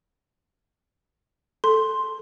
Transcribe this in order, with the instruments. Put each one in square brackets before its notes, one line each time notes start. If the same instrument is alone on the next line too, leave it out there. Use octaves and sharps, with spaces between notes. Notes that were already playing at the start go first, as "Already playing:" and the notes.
[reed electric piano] A4 [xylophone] C6